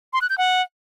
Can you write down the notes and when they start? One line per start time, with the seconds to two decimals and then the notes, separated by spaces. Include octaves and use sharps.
0.13 C6
0.21 F#6
0.30 G6
0.38 F#5